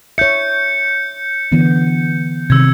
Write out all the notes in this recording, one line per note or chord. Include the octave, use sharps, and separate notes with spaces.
C#5 E5 G6 C#7
D3 E3 B3
C3 D#3 E6 G#6